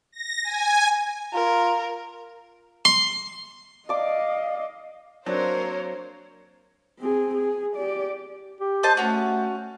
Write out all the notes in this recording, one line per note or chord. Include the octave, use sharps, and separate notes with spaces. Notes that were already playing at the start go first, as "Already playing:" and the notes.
A#6
G#5
F4 A#4
C6
D5 D#5 F5 D6
F#3 A#3 C4 D4 A#4 C5 C#5
C4 G#4
G#4
G4 D5
G4
C5 D#5 A5
A3 C#4 F#4